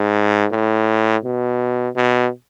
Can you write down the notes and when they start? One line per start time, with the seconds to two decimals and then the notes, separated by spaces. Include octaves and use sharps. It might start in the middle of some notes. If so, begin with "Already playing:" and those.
Already playing: G#2
0.52 A2
1.24 B2
1.96 B2